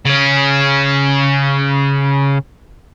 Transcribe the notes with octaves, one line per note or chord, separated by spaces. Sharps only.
C#3 C#4